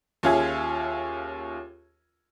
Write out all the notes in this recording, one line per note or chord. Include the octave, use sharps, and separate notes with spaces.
D#2 C#4 F4 G#4 E5 G#6